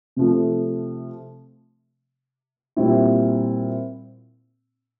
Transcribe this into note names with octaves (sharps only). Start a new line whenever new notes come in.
C3 F3 A3
A#2 G3 C4 E4